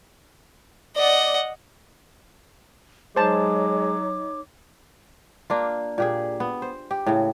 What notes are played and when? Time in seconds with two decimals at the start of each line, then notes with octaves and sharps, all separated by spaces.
0.96 D5 D#5 F#5
3.16 F#3 G#3 D#4 C5 C#5 A5 D6
5.50 A#3 D4 F4
5.98 A#2 G4 G#4
6.40 B3
6.62 C5
6.91 G4
7.06 A2 C#3